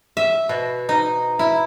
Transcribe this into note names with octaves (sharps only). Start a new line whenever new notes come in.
E5
B2
D#4
E4